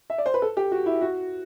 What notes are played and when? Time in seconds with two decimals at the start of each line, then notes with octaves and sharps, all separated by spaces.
0.10 E5
0.18 D5
0.26 C5
0.34 B4
0.42 A4
0.57 G4
0.72 F#4
0.86 E4
1.01 F#4